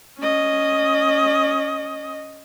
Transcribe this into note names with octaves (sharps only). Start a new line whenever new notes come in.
C#4 D#5